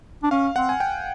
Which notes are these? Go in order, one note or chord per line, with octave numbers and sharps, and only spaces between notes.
D4
C#4 F5
C4 F#5
G#5
G5